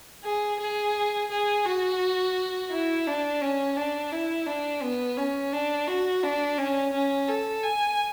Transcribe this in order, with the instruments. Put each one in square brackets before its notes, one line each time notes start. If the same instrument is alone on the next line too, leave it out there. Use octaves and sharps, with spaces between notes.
[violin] G#4
G#4
G#4
F#4
E4
D4
C#4
D4
E4
D4
B3
C#4
D4
F#4
D4
C#4
C#4
A4
G#5